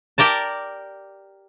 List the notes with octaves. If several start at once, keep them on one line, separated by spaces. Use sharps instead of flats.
G4 A#4 D5 A5